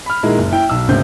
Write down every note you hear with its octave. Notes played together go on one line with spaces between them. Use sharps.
B5 F6
A#2 D#3 G#3 E4 A#4
F#1
E4 G5
B1 E6
G#1 D2 C#3 C4 G6